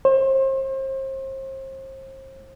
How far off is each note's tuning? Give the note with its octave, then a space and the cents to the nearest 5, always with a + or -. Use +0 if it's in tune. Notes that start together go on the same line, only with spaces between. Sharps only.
C5 +35